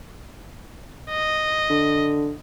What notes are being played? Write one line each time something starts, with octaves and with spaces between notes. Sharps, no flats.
D#5
D3